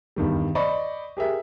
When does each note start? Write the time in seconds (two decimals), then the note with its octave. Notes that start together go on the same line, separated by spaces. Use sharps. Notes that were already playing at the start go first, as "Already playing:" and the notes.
0.16 E2 G2 D#3 G3
0.55 C5 D5 D#5 B5 C#6
1.17 G4 G#4 A#4 E5